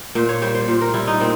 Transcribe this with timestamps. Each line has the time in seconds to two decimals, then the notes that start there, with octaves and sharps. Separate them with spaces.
0.15 A#2 C5
0.29 C#5
0.42 G3 C5
0.55 C5
0.68 A#2
0.81 A#4
0.94 G3 E4
1.07 D#4
1.20 A#2 C4